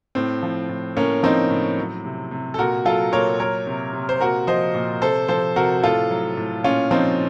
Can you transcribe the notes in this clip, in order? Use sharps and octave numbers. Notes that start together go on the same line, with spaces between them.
A2 C4
F3
A2
A2 A#3 C#4
F3 C4 D#4
A2
F#3
C3
C3
A4
A#2 F#4 A#4
F#3 F4 A4
A#2 A#4 C#5
F#3 A#4 C#5
C3
C3
C5
A#2 F#4 A#4
F3 C5 D#5
A#2
C3 A4 C5
F3 A4 C5
C3 F#4 A#4
A2 F4 A4
F#3
A2
A#2 C#4 F4
F3 C4 D#4